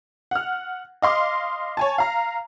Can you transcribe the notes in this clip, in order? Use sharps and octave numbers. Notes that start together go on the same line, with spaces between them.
F#5 F6
D#5 F5 C6 D6
C#5 G#5 A5
F5 A#5